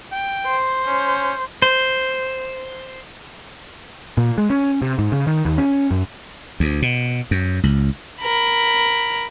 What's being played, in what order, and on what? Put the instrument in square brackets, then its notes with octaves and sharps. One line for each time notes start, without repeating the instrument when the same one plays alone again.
[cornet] G5
[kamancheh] C5
[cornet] C#4
[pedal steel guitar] C5
[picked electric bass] A#2
G#3
C#4
C3
G#2
C#3
D#3
D#2
C#4
F#2
[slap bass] D2
B2
F#2
C#2
[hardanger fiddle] A#4 B5